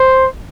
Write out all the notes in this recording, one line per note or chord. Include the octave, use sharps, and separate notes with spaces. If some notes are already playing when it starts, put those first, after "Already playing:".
Already playing: C5